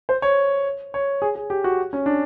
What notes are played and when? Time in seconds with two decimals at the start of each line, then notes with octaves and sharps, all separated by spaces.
0.09 C5
0.22 C#5
0.94 C#5
1.22 G#4
1.35 G#4
1.50 G4
1.64 F#4
1.93 C#4
2.06 D4